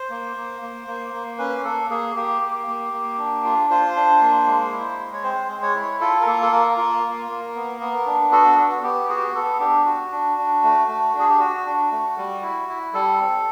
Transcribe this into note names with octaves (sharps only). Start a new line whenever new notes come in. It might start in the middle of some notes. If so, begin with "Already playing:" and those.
Already playing: C5
A#3
A#3
A#3
A#3
A#3
C#4 B4
A#3 A4
A#3 G#4
A#3 G4
A#3
A#3
A#3
D4
F4
F4 C5
D4
A#3
G#3
E4
G#3
C#5
C4 C5
G#3
C#5
E4
F4 A4
A#4
A#3 A4
A4
A#3 A#4
F4 A#4
A#3
A#3
B3
B3
D4
F#4 A4
B3
F#4
B3 G4
F#4 G#4
G4
G#4
B3 A4
D4 G4
F#4
D4
D4
A3
A3
D4 G#4
G4
F#4
D4
A3
G3
E4
E4
G3 A4
C4